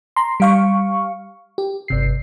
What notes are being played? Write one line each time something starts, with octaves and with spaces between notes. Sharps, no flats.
A#5 C6
G3 F5 C#6
G4
G1 C3 C7